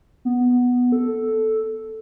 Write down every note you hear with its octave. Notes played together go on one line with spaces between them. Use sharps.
B3
A4